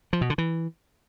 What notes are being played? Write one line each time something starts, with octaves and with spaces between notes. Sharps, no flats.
F3
B2
D3
E3